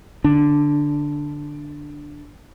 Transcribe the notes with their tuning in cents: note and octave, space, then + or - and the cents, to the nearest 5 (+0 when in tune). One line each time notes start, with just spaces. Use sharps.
D3 +0 D4 +0